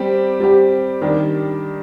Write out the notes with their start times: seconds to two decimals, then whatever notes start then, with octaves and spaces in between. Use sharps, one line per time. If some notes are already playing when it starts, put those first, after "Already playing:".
Already playing: G3 C4 G4
0.40 G3 C4 G4
1.01 D#3 G3 D4 G4